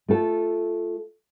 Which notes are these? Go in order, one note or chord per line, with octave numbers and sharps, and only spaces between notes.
A3 F4 A4